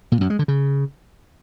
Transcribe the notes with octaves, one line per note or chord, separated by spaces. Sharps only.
A#2
F#2
G#3
D3
C#3